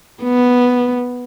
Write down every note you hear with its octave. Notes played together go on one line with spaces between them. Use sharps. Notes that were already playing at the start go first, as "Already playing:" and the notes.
B3